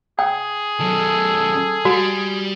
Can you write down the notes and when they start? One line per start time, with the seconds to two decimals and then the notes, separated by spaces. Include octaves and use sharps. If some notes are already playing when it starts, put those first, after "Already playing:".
0.19 G#4 G5
0.80 F#2 D#3 A4
1.85 G3 F#4